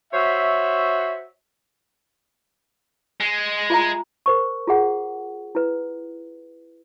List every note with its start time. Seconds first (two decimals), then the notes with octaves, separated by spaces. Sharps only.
0.13 F#4 C5 C#5 E5
3.20 G#3
3.70 F4 E5 A#5
4.26 A#4 C5 C#6
4.67 F4 G#4 F#5
5.55 E4 B4